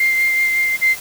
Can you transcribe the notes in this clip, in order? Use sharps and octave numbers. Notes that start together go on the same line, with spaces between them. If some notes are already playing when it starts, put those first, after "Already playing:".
Already playing: C7
C7